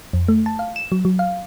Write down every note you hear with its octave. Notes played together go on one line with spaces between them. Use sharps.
F2
A3
A5
F5
E7
F#3
F#3
F5